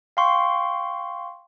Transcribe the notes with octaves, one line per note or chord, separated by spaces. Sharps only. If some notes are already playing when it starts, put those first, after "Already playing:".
F5 G5 C6 C#6